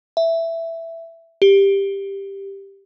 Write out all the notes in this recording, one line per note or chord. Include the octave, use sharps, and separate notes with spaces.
E5
G4